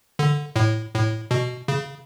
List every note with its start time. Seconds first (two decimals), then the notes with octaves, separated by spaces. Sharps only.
0.19 D3
0.56 A2
0.94 A2
1.31 B2
1.68 C#3